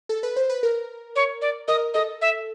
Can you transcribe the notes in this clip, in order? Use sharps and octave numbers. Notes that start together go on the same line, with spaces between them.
A4
B4
C5
B4
A#4
C#5
D5
A#4 D#5
A4 D#5
E5